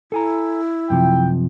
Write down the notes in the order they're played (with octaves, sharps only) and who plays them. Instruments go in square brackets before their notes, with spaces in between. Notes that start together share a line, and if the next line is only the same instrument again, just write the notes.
[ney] E4 [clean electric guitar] A4 G#5 A#5
[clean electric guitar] F#2 C3 F3 [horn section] G5